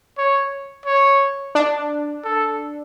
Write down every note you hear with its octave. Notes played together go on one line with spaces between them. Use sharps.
C#5
C#5
D4
A4